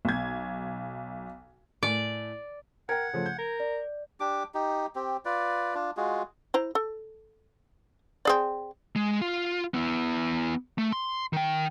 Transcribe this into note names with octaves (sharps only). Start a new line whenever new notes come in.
B1 G#6
A2 D5 G#5
A#4 F#5 G5 G#6
C#3 F3 A3
G6
A#4
D5
D4 G4 D6
D#4 G4
C4 G4
F4 B4 D5
D4 F4
G#3 F4 F#4 G#4
E4 C5 A#5
A4
C4 G#4 D5
G#3
F4
B3 E4
A3
C6
D#3 G5